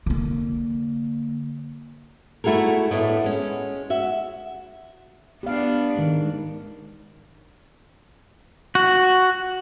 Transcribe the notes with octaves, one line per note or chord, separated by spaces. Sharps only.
D3 A#3
A3 E4 F#4 G#4 A#4
A2 A3 B3 D4 E4 D#5
G#3 C#4
F#4 E5
B3 D4 G4 F5
G#2 D#3
F#4